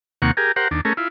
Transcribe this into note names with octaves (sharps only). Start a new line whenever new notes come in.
D#2 C3 A#3 F#5 C#6
G4 G#4 A#4
G4 A#4 C5 F#5
D#2 D4
A3 C#4 G#4 A#4
E4 F4